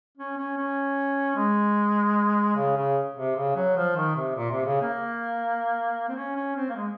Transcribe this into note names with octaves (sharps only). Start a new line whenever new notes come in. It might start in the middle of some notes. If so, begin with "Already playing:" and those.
C#4
C#4
C#4
G#3
C#3
C#3
C3
C#3
F#3
F3
D#3
C3
A#2
C3
C#3
A#3
C4
C#4
C#4
C4
A#3
G#3